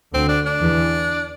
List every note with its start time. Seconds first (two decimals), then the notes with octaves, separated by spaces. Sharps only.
0.13 D2 D3 C4
0.29 D4
0.46 D4
0.61 E2 E3